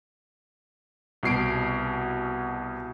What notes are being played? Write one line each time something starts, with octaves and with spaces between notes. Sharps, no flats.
C2 B2 C7 D7